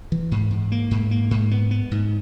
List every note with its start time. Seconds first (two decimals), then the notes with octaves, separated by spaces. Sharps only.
0.12 E3
0.31 G#2
0.51 G#2
0.72 A#3
0.91 G#2
1.11 A#3
1.31 G#2
1.51 B3
1.71 B3
1.91 G#2